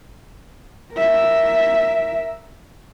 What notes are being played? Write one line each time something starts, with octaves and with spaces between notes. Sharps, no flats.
A#4 E5